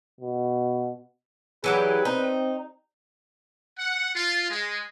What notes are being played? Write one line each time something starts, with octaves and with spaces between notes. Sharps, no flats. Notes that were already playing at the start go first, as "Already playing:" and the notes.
B2
E3 F#3 G4 G#4 B4
C4 D#4
F#5
F4
G#3